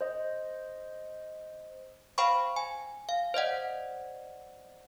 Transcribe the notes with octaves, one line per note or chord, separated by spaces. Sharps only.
C5 D#5
C5 F5 G5 B5 C#6
G#5
F5
C5 D5 D#5 F#5